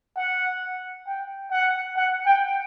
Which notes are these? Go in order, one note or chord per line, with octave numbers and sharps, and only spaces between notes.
F#5
G5
F#5
F#5
G5